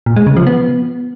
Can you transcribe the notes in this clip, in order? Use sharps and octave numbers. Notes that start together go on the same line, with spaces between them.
A#2
G#3
C#3
F3
B3